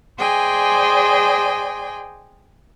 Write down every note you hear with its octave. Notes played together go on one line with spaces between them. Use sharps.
G#4 C5 D5 D#5 G5 G#5